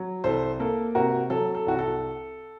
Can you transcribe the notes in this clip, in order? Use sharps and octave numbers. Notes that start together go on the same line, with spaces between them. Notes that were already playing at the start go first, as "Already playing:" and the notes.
Already playing: F#3
C2 A4 C5
A#3 A4
C3 F#4 A#4
F#3 A4
A4
C2 F#4
A4